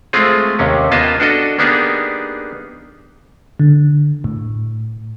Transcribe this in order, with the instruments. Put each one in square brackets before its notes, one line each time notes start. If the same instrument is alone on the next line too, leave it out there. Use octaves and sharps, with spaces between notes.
[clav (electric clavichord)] G#3 A3 C4 F4 G#4
D#2 C3 C#4
A#3 B3 F4 D#5 A5
D4 F#4 A4 D#5
A#3 B3 D4 D#4 G4 G#4
[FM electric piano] D3
A2